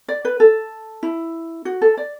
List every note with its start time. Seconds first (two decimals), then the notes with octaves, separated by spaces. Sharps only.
0.08 D5
0.25 B4
0.40 A4
1.03 E4
1.65 F#4
1.82 A4
1.97 D5